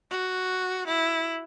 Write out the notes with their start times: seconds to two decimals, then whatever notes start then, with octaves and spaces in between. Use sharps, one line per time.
0.11 F#4
0.88 E4